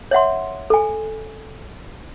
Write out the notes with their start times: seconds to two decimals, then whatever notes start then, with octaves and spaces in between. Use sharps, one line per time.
0.11 C#5 E5 F#5 C6
0.70 A4 G#5